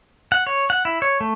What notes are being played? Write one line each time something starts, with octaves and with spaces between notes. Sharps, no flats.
F#5
C#5
F#5
E4
C#5
A3